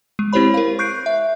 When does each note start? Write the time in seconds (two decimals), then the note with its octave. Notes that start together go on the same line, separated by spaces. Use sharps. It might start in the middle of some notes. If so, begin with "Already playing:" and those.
0.19 G#3
0.33 C4 E4 G4 C5 C#5 B5
0.54 A#4 F5
0.79 C#6 F#6 G6 C7 D7
1.06 E5